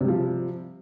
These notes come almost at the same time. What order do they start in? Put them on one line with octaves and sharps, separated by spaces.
C3 G3 F3